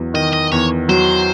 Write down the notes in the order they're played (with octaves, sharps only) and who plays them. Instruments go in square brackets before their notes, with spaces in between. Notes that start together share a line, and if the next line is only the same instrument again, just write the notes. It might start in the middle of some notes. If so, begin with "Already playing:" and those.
Already playing: [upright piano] E2 F#3
[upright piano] D#3 [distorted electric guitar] D#5
[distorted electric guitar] D#5
[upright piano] E2 [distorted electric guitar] C#5
[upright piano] F#3 [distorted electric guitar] C5